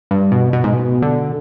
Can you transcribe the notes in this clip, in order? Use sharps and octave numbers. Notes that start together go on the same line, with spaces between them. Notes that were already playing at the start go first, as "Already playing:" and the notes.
G2
B2
B2
G#2
B2
D3